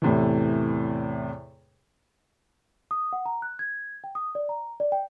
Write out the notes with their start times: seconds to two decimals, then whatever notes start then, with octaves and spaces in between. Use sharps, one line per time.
0.02 E2 A2 C3 E3
2.91 D#6
3.13 F#5
3.26 A#5
3.42 F#6
3.59 G#6
4.04 G5
4.15 D#6
4.35 D5
4.49 A#5
4.80 D5
4.92 G5